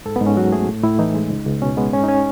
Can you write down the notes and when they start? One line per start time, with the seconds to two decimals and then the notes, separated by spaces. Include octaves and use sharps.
0.05 G#2 A4
0.16 B3
0.21 G#2
0.26 C#4
0.37 F#3 F#4
0.52 A3 G#4
0.68 A2
0.83 A2 E4
0.99 E3 D#4
1.15 G#3
1.30 C#2
1.47 C#2
1.62 B2 C#4
1.77 G#3 B3
1.93 G#2 C#4
2.03 D#4
2.08 C#4